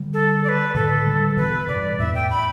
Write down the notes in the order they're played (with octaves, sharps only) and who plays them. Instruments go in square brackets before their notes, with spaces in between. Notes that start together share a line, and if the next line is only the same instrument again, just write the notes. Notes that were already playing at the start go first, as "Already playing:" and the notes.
Already playing: [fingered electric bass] D3 G3
[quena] A4
D5
B4
[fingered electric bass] A2 D3 [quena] A4
[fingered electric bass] D3 G3
[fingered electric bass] B2 E3 [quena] B4
[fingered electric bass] G2 B2 [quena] D5
[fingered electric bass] E2 A2 [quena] E5
[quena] G5
B5